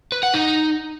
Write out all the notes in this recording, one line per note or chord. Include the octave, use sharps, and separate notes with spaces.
B4
F#5
D#4